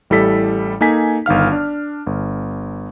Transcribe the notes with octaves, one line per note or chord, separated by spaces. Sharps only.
A1 G3 E4 A4 B6
A#3 D#4 A4 G#5 B6
G1 D#3 F5 F6
D4
G1